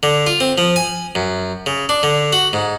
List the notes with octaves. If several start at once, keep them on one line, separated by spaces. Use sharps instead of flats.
D3
F4
C4
F3
G#5
F#2
C#3
D4
D3
F#4
G#2